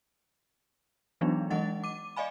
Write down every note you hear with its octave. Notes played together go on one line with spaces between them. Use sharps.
E3 F#3 G#3 B3 D4 D#4
E3 G#3 D#5 F#5 A6
D6 D#7
D5 D#5 F5 G#5 B5